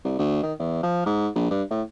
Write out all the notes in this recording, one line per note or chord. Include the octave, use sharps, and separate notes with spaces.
C2
D2
D#3
E2
F3
G#2
A#1
G2
A2